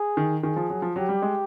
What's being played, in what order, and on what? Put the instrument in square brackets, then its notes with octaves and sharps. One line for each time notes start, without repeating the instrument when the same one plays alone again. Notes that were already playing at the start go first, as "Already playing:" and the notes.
Already playing: [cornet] G#4
[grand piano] D#3
[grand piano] D#3 [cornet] G#4
[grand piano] F3
F#3
F3
[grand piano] F#3 [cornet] G4
[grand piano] G3
G#3